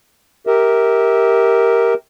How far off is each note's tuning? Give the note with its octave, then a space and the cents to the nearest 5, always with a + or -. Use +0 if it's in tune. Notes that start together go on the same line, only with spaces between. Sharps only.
G4 +0 A#4 +0 E5 -25